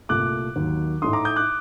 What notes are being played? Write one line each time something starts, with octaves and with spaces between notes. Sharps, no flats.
C2 A#2 A3 D6 F#6
D#2 D#3 F#3
A2 A3 D#4 C6 D#6
A#5 D6
D#6 G6
D6 F#6